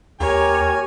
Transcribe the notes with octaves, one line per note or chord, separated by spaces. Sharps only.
D#2 G4 A#4 C#5 G#5